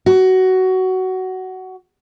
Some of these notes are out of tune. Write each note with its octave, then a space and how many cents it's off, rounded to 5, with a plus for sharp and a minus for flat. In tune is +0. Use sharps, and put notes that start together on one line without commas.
F#4 +15